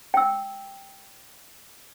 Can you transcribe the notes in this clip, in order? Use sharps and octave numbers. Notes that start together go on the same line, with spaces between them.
G5 E6